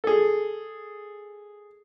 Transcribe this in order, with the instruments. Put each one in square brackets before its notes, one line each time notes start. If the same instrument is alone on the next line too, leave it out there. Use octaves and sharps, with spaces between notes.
[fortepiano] G#4 A4